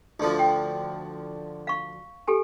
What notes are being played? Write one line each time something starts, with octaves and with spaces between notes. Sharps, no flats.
D2 D3 F3
G5
F5 C#6
G4 A4 G#5